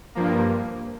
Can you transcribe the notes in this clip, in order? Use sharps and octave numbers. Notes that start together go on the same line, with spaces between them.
G2 F3 A#3